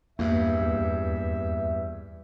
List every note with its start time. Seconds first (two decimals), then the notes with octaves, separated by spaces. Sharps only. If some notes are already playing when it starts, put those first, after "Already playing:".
0.19 E2 G2 A#3 E5
0.61 D#2